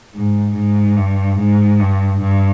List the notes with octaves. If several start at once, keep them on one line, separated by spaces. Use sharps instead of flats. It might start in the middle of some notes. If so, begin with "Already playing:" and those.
G#2
G#2
G2
G#2
G2
G2